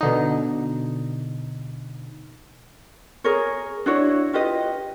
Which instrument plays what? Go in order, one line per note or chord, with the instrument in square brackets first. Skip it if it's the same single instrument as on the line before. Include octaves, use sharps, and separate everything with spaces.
[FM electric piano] B2 D3 D#4
[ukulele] G#4 A#4 C#5
D4 E4 F#4 C#5
F4 G4 B4 D#5